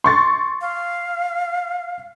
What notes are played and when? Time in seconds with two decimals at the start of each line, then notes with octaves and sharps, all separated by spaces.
0.04 C6 C#6 A6
0.61 F5